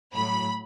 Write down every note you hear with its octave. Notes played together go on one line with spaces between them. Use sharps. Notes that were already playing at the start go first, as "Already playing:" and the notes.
A2 F#3 B5